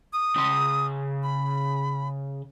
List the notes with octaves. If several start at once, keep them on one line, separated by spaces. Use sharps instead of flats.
D#6
C#3 C6
B5